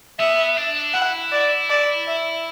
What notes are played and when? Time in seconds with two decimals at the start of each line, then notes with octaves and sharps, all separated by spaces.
0.19 B3 E5
0.57 D4
0.94 E4 F#5
1.32 D5
1.70 D5
2.07 E5